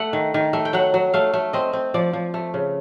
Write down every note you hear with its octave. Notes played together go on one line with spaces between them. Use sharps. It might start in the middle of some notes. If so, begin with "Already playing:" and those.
Already playing: A3 F#5
D#3
D#3
A3
G5
F#3 F#5
F#3
A3 F5
A3
C4 D#5
C4
F3 D5
F3
A3
C#3